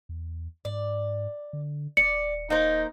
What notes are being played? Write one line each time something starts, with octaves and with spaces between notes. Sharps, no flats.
E2
G#2 D5
D3
D#1 D5 C#7
A#3 D#4 C5